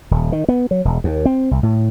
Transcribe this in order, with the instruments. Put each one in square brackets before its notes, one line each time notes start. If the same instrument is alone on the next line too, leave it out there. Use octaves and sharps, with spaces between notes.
[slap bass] D#1
D#3
B3
F#3
E1
D#2
C4
C2
A2